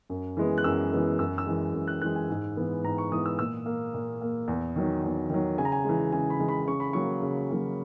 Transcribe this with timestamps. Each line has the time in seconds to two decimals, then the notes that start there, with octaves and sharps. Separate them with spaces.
0.10 F#2
0.37 E3 G#3 B3
0.58 F#6
0.64 F#2 E6
0.93 E3 G#3 B3
1.19 F#2 E6
1.38 E6
1.47 E3 G#3
1.74 F#2
1.87 F#6
2.02 E3 G#3 F#6
2.16 G#5
2.30 G#2
2.57 E3 G#3 B3
2.84 G#2 A#5
2.98 C#6
3.12 E3 G#3 B3 D#6
3.26 E6
3.38 A#2 E6
3.66 A#3
3.94 A#2
4.21 A#3
4.48 E2
4.76 D#3 F#3
5.03 E2
5.30 D#3 F#3
5.58 C#3 G#5
5.65 A#5
5.72 G#5
5.85 E3 G#3
6.12 C#3 G#5
6.30 B5
6.40 E3 G#3
6.48 B5
6.67 C#3 C#6
6.80 B5
6.93 F#3 A#3 C#6
7.22 C#3
7.50 F#3 A#3